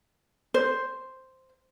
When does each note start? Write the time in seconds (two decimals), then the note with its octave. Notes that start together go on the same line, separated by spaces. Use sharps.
0.54 C5